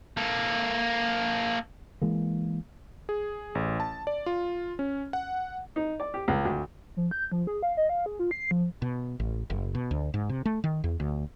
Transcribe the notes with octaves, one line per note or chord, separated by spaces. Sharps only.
A#3 A4
E3 G#3 A#3
G#4
A1
A5
D5
F4
C#4
F#5
D#4
D5
G4
C#2
D2
F3
G6
F3
G#4
F5
D#5
F5
G#4
F4
C7
F3
B2
A1
F#1
B2
D2
G#2
C3
A3
D#3
E2
D2